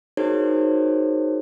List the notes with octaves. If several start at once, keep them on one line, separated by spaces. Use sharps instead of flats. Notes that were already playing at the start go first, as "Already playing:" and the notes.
D#4 F#4 G#4 A#4 C5 C#5